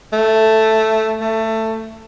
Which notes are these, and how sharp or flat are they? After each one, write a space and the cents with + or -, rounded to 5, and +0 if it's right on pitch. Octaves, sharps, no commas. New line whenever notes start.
A3 +0
A3 +15